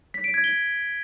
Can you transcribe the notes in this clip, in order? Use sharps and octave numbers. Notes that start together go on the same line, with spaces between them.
B6
D7
G#6
G7